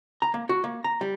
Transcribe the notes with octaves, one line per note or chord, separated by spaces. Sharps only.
A#5
A#3
F#4
A#3
A#5
G3